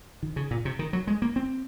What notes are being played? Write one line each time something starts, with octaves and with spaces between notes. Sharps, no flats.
D#3
C#3
A#2
C3
D#3
F#3
G#3
A#3
C4